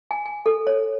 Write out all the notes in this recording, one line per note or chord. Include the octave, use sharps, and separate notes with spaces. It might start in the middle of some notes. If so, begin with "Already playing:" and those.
G#5
G#5
A4
C#5